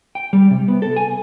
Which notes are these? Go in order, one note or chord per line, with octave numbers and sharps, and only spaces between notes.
G5
G3
C3
B3
A4
G#5